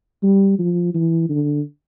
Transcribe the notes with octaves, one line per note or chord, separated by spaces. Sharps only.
G3
F3
E3
D3